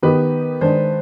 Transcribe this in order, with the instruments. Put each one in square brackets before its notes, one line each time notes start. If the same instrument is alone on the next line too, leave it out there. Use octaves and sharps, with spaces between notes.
[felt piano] D#3 B3 D#4 G4 [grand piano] B4
[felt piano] D#3 G#3 D4 [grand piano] C5